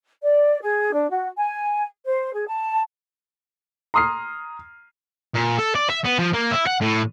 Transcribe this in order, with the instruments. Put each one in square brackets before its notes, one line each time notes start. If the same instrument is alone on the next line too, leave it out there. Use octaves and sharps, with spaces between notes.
[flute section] D5
G#4
D4
F#4
G#5
C5
G#4
A5
[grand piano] A#5 C6 D#6 F6 C7
[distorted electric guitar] A#2
A4
D5
E5
B3
F3
A#3
E4
F#5
A2